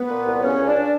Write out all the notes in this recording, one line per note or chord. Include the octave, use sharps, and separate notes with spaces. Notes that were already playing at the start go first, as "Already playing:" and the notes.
Already playing: B3 B4
A#2
C2
C#3 C#4 C#5
C#2
D4 D5